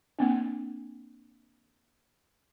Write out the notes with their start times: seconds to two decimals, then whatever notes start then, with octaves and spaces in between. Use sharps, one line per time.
0.19 A#3 C4 D4